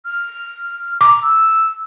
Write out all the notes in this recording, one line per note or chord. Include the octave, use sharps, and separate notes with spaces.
F6
A#5 D6
E6